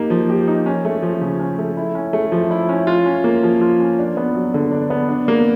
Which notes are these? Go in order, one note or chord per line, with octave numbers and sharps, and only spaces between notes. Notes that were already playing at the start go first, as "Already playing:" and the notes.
Already playing: A#3 D#4 G4
F3
G4
D#4
C#4
A3
F3
C#3
C#4
A3
E4
C#4
A3
F3
E4
C#4
F4
C#4
A#3
F3
F4
C#4
D4
B3
F#3
D3
D4
B3
D4
A#3